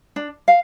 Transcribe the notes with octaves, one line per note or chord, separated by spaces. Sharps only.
D4
F5